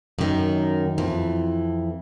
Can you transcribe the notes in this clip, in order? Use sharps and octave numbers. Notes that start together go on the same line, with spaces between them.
F#2 D#3
F2 E3